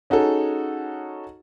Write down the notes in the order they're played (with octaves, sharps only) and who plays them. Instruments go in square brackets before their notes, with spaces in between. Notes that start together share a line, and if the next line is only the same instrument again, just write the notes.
[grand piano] C#4 D#4 F#4 G#4 A4